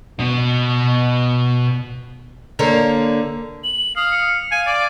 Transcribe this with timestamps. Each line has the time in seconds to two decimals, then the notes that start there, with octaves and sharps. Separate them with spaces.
0.19 B2 F#4
2.59 D3 A#3 C#5
3.64 F#7
3.96 F5 D#6
4.12 C#7
4.51 F5 G#5
4.67 D5